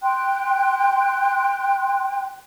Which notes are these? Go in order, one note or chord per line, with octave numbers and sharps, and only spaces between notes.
G5 C6 F#6